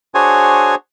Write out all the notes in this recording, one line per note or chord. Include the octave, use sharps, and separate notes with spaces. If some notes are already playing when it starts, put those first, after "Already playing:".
D4 F#4 G#4 C5 C#5 G#5